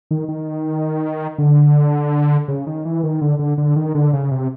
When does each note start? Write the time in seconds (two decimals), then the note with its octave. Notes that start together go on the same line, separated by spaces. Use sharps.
0.11 D#3
0.29 D#3
1.38 D3
2.48 C#3
2.67 D#3
2.85 E3
3.03 D#3
3.21 D3
3.39 D3
3.58 D3
3.76 D#3
3.95 D3
4.13 C#3
4.31 C3